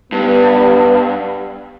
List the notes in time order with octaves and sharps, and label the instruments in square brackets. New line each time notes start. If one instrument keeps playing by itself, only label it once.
[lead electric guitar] G2 [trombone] B3